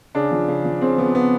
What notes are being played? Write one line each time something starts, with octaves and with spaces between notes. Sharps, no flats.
C#3 D4
F3
C#3
F3
C#3 C4
F3 B3
C#3 B3